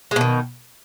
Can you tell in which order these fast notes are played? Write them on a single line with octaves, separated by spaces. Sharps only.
G#3 B2 D#3